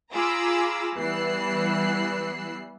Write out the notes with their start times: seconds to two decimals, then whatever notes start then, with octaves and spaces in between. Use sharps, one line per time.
0.12 F4 G#4 A#5 B5 D6 E6
0.96 E3 G3 B3 E6 F#6 C7